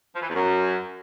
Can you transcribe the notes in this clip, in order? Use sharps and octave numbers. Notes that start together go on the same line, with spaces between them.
F3
E3
E2
F#2